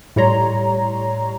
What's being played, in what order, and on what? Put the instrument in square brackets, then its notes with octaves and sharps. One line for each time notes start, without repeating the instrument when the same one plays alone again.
[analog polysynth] A2 G3 C#5 A#5 C6